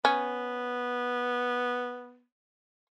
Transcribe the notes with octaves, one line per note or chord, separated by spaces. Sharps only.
B3 C#4